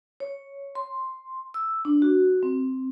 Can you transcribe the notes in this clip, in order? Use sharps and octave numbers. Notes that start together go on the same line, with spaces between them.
C#5
C6
E6
D4
F#4
C4